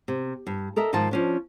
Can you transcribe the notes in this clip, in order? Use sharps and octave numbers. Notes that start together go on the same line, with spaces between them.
C3
G2
A4 A#4 D#5 E5
G#2 D#3 F3 F4 A5
F3 C#4 D4